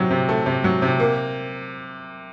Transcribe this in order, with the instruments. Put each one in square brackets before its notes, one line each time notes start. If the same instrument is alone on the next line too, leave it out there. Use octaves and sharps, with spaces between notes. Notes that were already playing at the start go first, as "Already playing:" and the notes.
Already playing: [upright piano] C3 F#3
C3
A3
C3
F#3
C3
A#3